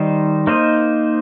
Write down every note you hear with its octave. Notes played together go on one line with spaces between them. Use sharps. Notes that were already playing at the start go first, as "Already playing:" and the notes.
Already playing: D#3 G3 D#4 C5 D#5
A#3 D#4 C5 D#5